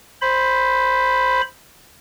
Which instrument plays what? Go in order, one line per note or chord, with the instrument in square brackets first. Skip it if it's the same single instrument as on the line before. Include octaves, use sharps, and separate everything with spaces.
[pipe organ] C5 B5